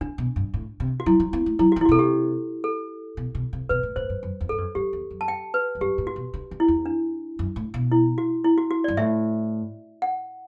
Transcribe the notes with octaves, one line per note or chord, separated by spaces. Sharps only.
D3 D4
B2
G2
A2
C3
F#4
F#3 E4
F#3
B3
A3
F#3 E4
E3 F#4
E4
B2 F#4
C3 A4
G4
A4
B2
B2
C3
B2 B4
A2
A2 C5
G2
F#2
E2
G2 A4
F#2
G2 G4
E2
F#2
A5
G5
B4
F#2
G2 G4
A2
F#4
B2
D3
D3
E4
E2
D4
F#2
A2
B2
E4
F#4
E4
F#4
F#4
G2 D5
A2 E5
F#5